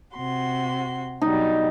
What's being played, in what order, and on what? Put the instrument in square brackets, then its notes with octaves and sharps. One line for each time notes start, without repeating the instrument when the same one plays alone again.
[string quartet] C3 F#4 C6
[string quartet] B2 F#3 G3 [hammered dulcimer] D#4